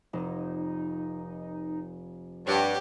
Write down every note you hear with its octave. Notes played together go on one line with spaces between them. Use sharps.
F1 D#4
G2 G4 C#5 F#5